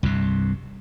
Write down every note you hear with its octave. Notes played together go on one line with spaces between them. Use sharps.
C2 G2 C3